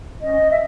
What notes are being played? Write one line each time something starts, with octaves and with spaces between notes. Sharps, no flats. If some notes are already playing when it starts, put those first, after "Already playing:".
C#4 D#5
E5